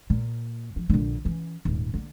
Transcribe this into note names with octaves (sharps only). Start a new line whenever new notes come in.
A#2
F3
A#1 D3
E3 C#4
D#1 G#2
D3 A#3